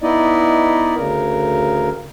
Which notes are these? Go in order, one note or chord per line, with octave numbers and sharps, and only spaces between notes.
B3 D#4 E4 D5 D#5
D2 C#3 A#4